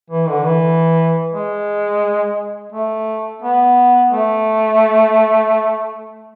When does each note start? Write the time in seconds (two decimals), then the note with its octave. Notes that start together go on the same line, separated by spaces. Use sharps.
0.10 E3
0.28 D3
0.45 E3
1.33 G#3
2.73 A3
3.42 B3
4.12 A3